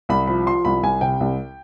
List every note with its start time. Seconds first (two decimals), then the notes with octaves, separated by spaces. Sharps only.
0.09 C2 B5
0.27 F3 B5
0.47 F3 C6
0.65 C2 B5
0.83 C2 G#5
1.01 C3 G5
1.20 C2